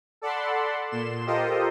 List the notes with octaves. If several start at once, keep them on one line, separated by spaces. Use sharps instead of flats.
A4 D5 F#5 A5 B5 C6
A#2 C6 E7
F4 G4 A4 A#4 C5 D#5